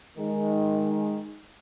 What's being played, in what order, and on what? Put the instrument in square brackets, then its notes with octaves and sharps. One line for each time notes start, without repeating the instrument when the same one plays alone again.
[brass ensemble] D#3 G#3